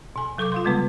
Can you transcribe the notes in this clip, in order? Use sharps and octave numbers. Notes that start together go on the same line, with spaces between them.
B2 G#5
C3 F#3 A4 C#6 D6 G6
F4 F5 C6
C#3 G3 G#3 B3 B4